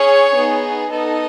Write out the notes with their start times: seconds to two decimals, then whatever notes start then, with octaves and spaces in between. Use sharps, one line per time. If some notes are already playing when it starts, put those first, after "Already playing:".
Already playing: C#4 G#4 C#5
0.36 B3 D#4 G#4
0.90 B3 D#4 A4 D#5